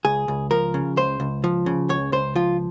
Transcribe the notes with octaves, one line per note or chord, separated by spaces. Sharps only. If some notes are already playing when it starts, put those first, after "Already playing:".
C#2 G#4
C#2
F3 A#4
C#3
C#2 C5
C#2
F3
C#3
C#2 C#5
C#2 C5
F3 F4